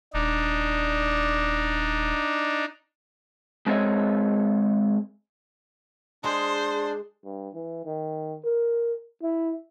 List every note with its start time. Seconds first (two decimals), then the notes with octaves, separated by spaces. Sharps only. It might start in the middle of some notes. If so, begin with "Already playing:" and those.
0.14 D#1 D4 D#4
3.66 G#3 C4 G#4 C#5 D#5 E5
6.24 G#3 D4 G#4 C5
7.25 G2
7.54 E3
7.86 D#3
8.45 A#4
9.23 E4